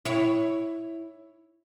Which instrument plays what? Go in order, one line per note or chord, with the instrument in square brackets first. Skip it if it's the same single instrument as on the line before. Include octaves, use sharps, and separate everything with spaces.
[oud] E4 C#5